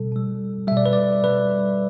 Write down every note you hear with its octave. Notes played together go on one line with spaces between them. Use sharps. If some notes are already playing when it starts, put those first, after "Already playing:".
Already playing: B2 G3 A4
B2 G3
B2 G3 E5
D5
B4
D5
B2 G3 B4